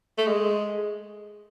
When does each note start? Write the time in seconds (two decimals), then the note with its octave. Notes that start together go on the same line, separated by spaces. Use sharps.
0.18 A3
0.27 G#3